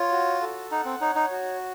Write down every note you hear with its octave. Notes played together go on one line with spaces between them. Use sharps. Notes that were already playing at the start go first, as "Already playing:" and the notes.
Already playing: F4 C#5
F#4
A4
D#4 F#5
C4
D#4 C#5
D#4
F#4